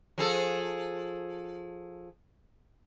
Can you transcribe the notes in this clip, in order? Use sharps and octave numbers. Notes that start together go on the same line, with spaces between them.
F3 G#4 A4